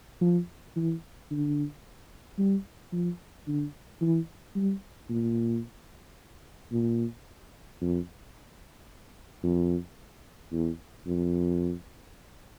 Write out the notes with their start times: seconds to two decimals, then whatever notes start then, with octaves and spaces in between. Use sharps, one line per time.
0.21 F3
0.76 E3
1.31 D3
2.38 G3
2.92 F3
3.47 D3
4.01 E3
4.55 G3
5.10 A#2
6.72 A#2
7.81 F2
9.43 F2
10.52 E2
11.07 F2